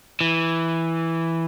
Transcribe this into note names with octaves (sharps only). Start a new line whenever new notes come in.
E3